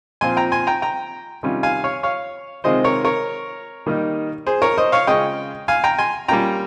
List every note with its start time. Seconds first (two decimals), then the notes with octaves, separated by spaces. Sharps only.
0.21 A#2 F3 C4 F4 G#5 C6
0.37 G5 A#5
0.52 G#5 C6
0.67 G5 A#5
0.82 G5 A#5
1.43 C3 D#3 G3 C#4 F4
1.63 F5 G#5
1.84 C#5 F5
2.03 C#5 F5
2.64 C3 D#3 G#3 C4 F4 C5 D#5
2.84 A#4 C#5
3.05 A#4 C#5
3.86 D#3 G3 A#3 D#4
4.47 G#4 C5
4.62 A#4 C#5
4.78 C5 D#5
4.92 C#5 F5
5.07 C#3 G#3 C#4 F4 D#5 G5
5.68 F5 G#5
5.84 G5 A#5
5.98 G#5 C6
6.28 G3 A#3 C#4 F4 G5 A#5